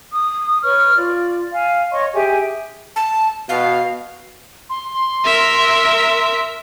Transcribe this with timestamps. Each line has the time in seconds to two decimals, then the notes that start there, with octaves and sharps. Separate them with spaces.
0.12 D#6
0.62 B4 C#5 C#6 F6
0.96 F4 D5
1.53 F5 G#5
1.91 C#5 D#5 C6 C#6
2.14 G4 G#4 E5 G#5
2.96 A5
3.49 B2 F5
4.70 C6
5.25 A#4 E5